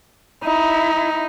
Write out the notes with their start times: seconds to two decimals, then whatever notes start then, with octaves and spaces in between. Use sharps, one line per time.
0.44 D#4 E4